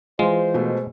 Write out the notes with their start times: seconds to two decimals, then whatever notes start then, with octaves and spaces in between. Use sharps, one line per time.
0.19 E3 G#3 F4 C5
0.54 B2 A3